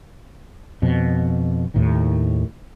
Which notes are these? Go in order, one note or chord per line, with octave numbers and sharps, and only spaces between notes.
F2 B2
D#2 A2 D#3